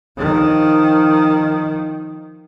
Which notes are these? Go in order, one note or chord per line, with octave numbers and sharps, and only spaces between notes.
D#3 F3